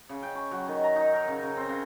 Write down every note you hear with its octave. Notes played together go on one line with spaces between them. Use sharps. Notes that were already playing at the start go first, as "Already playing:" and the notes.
C#3
G5
C#6
F#3
D#3
A#5
D#4
A#4
C#3
C#3
C4
C#3